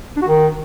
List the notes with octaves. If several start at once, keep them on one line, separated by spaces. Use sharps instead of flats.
D4
F#4
D#3